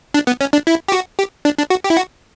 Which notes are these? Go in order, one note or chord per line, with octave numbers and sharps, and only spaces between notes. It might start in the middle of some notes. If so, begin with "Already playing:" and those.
D4
B3
C#4
D4
E4
G4
F#4
G4
D4
D4
F#4
G4
E4
F#4